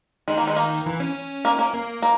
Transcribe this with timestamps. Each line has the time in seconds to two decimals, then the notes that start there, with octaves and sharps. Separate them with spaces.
0.28 D#3 G#3
0.38 A#3
0.47 G#3
0.56 A#3
0.86 E3
1.00 C#4
1.45 A#3
1.59 A#3
1.74 A#3
2.02 A#3